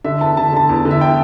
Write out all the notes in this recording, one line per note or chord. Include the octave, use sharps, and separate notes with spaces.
D3 E5
E2 A5
D3 A5
D3 A5
E2
D3
E5
G5